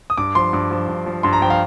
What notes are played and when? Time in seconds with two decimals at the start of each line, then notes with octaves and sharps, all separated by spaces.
0.10 D#6
0.18 G2 D6
0.35 F3 C6
0.53 G2 D6
0.71 F3
0.88 G2
1.06 F3
1.23 G2 C6
1.33 A#5
1.42 F3 G5
1.50 F5